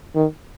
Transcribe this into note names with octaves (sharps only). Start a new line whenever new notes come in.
D#3